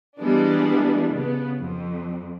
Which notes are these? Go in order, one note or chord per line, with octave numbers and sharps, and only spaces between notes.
E3 G3 G#3 B3 D4
C#3 B3
F2